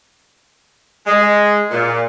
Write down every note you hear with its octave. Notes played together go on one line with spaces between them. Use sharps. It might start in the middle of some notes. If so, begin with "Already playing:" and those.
G#3
A#2